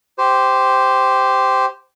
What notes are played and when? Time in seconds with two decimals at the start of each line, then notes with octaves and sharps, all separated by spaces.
0.18 G4 C5